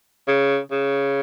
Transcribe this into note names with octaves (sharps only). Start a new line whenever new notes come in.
C#3
C#3